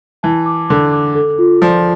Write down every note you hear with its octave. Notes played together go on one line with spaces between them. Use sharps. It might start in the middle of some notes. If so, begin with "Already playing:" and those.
E3 A5
D6
D3 D6
D6
A4
F4
F3 D5